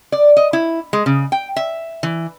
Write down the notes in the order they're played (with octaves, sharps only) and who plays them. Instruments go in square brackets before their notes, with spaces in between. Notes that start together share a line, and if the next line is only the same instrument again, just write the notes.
[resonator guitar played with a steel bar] D5
D#5
E4
G#3
C#3
G5
E5
E3